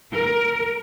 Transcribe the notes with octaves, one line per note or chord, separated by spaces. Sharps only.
A#4